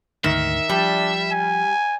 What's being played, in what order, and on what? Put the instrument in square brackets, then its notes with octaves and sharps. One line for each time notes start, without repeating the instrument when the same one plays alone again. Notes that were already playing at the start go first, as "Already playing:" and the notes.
[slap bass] D2 G#2 D3 [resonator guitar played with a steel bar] D#3 [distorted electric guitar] E5
[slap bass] F3 [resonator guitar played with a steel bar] G3 [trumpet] D4
[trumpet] G#5